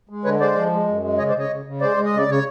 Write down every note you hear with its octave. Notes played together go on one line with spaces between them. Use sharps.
G#3
D3 B4 C#5
G#3 C5 D5
F3
G#3
F#2
G#3
C#3 C#5 D#5
C5 D5
C#3 C#5 D#5
C#3
C#3
G#3 C5 D5
G#3
D#5
C#3 D5
C#3 C#5